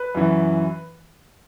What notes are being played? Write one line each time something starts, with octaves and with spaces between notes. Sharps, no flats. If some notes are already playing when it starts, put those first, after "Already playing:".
Already playing: B4
F#2 E3